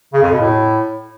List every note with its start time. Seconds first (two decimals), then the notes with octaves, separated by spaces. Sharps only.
0.14 C#3
0.23 F2
0.32 B2
0.41 A2